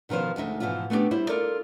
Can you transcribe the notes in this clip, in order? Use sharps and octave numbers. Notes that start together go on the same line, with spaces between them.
B2 D#3 F3 B3 C5
D2 G#3 D#4 E5
G#2 B2 E3 F3 F4
A3 B3 D4 D#4 G4
G3 E4 C5
F4 A4 A#4 D5